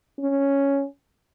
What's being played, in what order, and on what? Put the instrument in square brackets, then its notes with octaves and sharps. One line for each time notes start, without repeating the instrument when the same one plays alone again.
[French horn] C#4